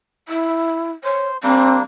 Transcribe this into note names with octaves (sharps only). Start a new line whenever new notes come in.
E4
C5 C#5
G3 A#3 C4 D4